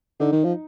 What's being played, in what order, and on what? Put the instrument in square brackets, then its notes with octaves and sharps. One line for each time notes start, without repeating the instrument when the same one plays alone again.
[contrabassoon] D3 [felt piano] D#4
[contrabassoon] D#3
F3